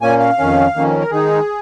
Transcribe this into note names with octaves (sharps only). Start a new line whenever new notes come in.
A#2 A#3 C#4 G#5
F5
F2 D#3 C#4
F2 D#3 A#3 C#4
A#4
D#3 G#3 D#4 G#4